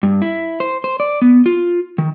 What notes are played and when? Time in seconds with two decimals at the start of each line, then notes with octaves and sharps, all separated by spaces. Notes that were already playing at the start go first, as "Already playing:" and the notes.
0.03 G2
0.22 E4
0.60 C5
0.84 C5
1.00 D5
1.22 B3
1.46 F4
1.98 D#3